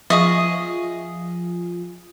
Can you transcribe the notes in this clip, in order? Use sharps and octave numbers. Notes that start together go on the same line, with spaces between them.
F3 F4 G#4 D#5 E5 C#6 D#6